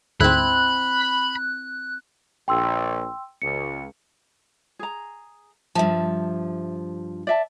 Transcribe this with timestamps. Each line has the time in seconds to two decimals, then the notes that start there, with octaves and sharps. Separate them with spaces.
0.21 D2 G#2 C4 E4 B5 F#6
2.48 A#1 G5 C6 E6
3.42 C#2 C#7
4.79 G#4 A#5
5.75 G2 F3 E5 A5
7.27 D5 E5 A5